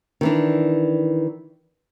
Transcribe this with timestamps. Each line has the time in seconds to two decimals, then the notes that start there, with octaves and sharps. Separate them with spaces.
0.21 D#3 E3 D4